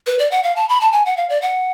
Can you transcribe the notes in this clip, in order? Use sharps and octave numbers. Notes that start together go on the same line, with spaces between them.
B4
D5
F#5
F5
A5
B5
A5
G#5
F#5
F5
D5
F#5